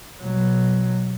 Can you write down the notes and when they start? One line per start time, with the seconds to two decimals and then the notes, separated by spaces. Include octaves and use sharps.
0.23 B2 F#3